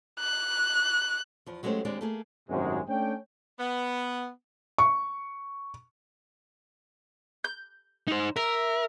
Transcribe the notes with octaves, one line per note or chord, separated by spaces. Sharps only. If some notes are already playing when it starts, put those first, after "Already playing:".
F#6
E2 F3
F#3 G#3 A3 C#4 G4 C5
D#2 G#3 C4 D4 G4 D5
A3 A#3 G#4
G#1 F#2 A2 C3 G#3
A3 C#4 D4 C#5 G5
B3
C#6
G6
D#4 C5
A#4 E5